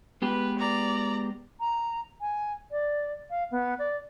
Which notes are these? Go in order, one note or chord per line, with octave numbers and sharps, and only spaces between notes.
G#3 B3 G4 B4
D5 A#5
A#5
G#5
D5
F5
B3
D5